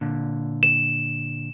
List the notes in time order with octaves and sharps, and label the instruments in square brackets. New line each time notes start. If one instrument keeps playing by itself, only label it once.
[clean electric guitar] A#2 D3
[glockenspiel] E7